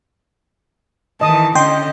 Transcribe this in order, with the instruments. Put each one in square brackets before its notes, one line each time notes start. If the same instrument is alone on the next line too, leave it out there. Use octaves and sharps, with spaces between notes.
[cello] D#3 E3 [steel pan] D#5 D#6 [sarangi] A5
[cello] D3 C#4 [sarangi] D#5 [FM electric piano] G5 [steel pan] C6